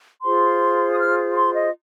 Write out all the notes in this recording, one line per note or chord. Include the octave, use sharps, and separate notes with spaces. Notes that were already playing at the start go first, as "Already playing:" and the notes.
F4 G#4 C5 C6
D#6
F6
C6
D#5